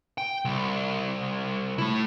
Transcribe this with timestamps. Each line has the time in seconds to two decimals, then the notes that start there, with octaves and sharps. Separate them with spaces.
0.18 G5
0.45 C2
1.78 A3 E4